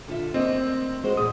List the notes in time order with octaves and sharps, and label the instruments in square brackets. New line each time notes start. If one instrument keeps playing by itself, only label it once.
[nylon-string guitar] D3 F4 E5
[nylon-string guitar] D2 A#3 D#5 [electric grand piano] C4
[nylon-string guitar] F#3 G#3 C5
[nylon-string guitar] E2 A#2 C#3 [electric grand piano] D#6